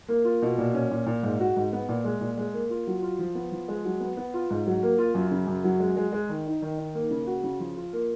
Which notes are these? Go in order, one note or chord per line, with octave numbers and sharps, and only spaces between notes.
A#3
F4
B2
A#2
C#4
A#2
A#2
G#2
F#4
G#2
B3
A#2
G#3
A#2
G#3
A#3
F4
F#3
F4
F3
B3
F3
G#3
F#3
B3
B3
F4
G#2
F#3
A#3
F4
F#2
C#3
F#2
F#3
G#3
G#3
G#3
D#3
D#4
D#3
D#4
A#3
C#3
F#4
C#3
F3
F4
A#3